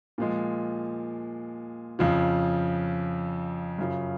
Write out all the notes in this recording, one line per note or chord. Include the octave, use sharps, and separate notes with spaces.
A#2 F3 G#3
F2 C#3 F3
F#2 C#3 F3